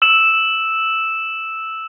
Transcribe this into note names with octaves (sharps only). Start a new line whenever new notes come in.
E6 E7